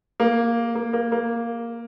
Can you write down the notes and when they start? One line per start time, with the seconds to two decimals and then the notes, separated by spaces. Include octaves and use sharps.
0.20 A#3
0.75 A#3
0.93 A#3
1.12 A#3